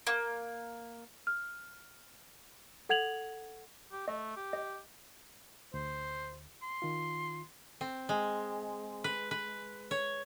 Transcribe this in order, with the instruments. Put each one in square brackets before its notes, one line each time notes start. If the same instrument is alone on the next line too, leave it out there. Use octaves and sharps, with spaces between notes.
[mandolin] A#3
[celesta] F6
A4 F#5 G#6 F7 F#7
[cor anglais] G4
[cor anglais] A3 [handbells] D#5
[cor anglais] G4
[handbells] D#5
[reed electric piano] D2 [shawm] C5
[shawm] C6
[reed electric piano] D#3 F4
[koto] C4
G#3
B4
B4
C#5